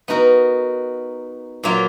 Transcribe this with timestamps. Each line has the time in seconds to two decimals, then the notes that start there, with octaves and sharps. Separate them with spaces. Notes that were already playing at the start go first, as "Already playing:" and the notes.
0.08 B3 D#4 F#4 A#4
1.64 A#2 F#3 A#3 F4